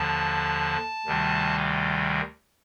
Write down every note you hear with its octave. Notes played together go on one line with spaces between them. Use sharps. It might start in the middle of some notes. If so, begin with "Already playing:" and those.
Already playing: D#2 D3 F3 A5
D2 C3 D#3 G3